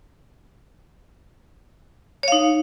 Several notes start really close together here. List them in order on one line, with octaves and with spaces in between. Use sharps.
C#5 F5 D#4